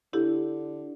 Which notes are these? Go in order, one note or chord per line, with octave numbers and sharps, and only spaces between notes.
D3 E4 G4 A4